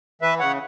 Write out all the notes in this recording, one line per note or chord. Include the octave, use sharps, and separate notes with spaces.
E3 B4 E5
C#3 C#5 F#5